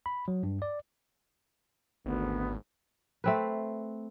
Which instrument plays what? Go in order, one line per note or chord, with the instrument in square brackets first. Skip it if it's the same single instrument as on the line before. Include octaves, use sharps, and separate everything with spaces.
[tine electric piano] B5
F#3
G2
D5
[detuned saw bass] G#1 [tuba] D2 [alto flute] B3
[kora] A3 C4 B4